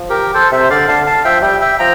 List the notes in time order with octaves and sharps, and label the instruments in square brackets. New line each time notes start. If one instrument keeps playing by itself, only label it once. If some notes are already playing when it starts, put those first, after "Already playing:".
Already playing: [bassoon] F3
[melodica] G4 A#4
A4 C5
[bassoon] C3 [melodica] C5 E5
[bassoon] D3 [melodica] D5 F5
[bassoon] D3 [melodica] F5 A5
[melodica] F5 A5
[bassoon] F3 [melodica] E5 G5
[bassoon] G3 [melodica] E5 G5
[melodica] E5 G5
[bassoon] F3 [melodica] G5 A#5